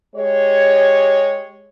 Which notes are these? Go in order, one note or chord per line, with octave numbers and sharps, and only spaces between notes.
G#3 G4 C#5